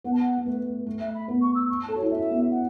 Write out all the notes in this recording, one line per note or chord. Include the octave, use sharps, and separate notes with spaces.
B3 F#5
A5
F#5
B3
A3 B4
A3
E5
B5
B3
C#6
E6
C#6
A5
A4
F#4 C#5
E4
C#4 E5
B3
F#5